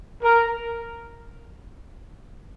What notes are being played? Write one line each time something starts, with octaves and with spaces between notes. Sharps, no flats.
A#4